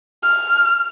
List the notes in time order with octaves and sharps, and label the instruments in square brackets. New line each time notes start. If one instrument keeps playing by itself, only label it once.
[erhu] F6